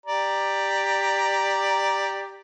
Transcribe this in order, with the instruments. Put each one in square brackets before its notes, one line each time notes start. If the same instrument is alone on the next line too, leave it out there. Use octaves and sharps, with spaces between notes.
[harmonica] G4 D5 A#5